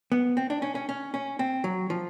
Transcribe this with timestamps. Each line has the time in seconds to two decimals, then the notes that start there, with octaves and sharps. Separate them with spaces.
0.12 B3
0.37 C4
0.50 D4
0.62 C#4
0.75 C#4
0.89 C#4
1.14 C#4
1.39 C4
1.64 F#3
1.90 F3